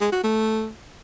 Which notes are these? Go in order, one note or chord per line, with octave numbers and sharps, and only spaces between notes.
G#3
F#4
A3